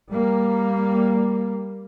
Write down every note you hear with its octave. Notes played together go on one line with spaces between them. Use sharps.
G3 A#3